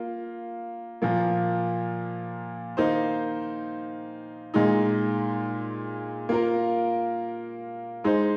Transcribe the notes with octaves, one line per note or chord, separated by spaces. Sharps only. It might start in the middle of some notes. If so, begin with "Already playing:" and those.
Already playing: A#3 F4
A#2 F3 A#3
D#3 A#3 D#4 C5
A#2 G#3 D#4
A#3 F4 A#4
G#3 D#4 C5